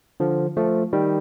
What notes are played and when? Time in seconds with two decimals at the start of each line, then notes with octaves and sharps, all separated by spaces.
0.20 D3 F3
0.57 F3 A3
0.93 D#3 G3